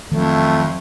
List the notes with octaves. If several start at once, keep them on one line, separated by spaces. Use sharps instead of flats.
F2 D#3 F3 F#3 A3